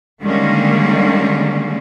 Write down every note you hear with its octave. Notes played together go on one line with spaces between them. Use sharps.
D3 D#3 G3 G#3 A#3 C#4